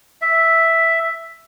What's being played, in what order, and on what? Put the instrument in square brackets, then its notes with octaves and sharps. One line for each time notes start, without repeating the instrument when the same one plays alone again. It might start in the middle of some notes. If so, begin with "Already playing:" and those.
[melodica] E5